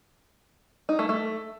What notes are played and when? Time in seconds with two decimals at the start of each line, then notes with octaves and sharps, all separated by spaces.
0.89 D#4
0.99 A3
1.09 A3